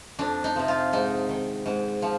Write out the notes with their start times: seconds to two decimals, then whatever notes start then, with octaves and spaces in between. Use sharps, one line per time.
0.19 F2 D4
0.44 D#4
0.56 C3 F3
0.68 F4
0.93 G#2 D#4
1.29 D#3
1.66 G#2
2.02 F3